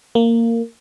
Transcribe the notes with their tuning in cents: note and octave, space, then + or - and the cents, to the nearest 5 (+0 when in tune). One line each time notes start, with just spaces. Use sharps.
A#3 -15